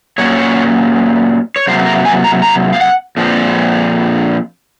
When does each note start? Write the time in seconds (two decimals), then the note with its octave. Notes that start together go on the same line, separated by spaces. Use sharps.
0.18 A#2 F#3 A#3 C#4 C#5
1.56 C#5
1.67 C3 F#3 A#3 C5
1.86 A#4
2.05 G#5
2.24 A#5
2.42 A#5
2.73 F5
2.80 F#5
3.17 A#2 F3 C4